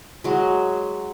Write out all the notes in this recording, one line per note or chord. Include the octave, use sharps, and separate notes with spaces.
F#3 G#3